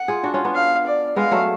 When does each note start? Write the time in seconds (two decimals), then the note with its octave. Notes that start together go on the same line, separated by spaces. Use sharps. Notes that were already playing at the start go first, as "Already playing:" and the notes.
Already playing: F#5
0.08 F4 G#4
0.23 D4 F#4
0.34 C#4 F4
0.45 B3 D4
0.54 F5
0.86 D5
1.16 G#3 B3 F5
1.31 F#3 A3